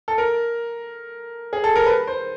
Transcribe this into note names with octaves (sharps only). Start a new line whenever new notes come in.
A4
A#4
G#4
A4
A#4
B4
C5